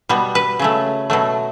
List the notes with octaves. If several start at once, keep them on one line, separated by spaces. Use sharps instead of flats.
B2 G3 B3
B4
C#3 F#3 A3
B2 F#3 A3